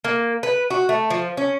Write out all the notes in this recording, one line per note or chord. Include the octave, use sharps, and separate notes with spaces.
A#3
B4
F#4
A3
F3
C#4